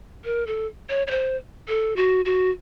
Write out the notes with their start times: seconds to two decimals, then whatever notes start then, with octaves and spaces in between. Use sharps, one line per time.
0.25 A#4
0.47 A4
0.90 C#5
1.07 C#5
1.11 C5
1.68 A4
1.96 F#4
2.25 F#4